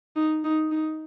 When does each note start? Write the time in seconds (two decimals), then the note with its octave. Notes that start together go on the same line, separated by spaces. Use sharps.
0.16 D#4
0.44 D#4
0.71 D#4